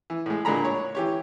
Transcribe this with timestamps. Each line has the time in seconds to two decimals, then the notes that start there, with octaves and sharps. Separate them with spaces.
0.10 E3
0.26 A2 G#3
0.45 A#2 D3 G#3 A#5 B5
0.65 C#5
0.95 E3 G4 C#5